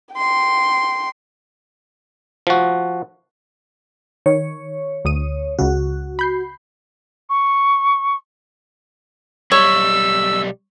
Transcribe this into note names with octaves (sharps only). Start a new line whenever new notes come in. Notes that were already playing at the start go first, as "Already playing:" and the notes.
G5 C6
F3 F#4
D#3 C#5
D2 D#6 D#7
C#2 C#3 F#4
B5 G6 C7
C#6
B1 G3 C#5 E6